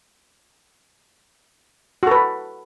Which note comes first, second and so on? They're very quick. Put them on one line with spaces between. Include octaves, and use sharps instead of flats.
F#4 A4 B4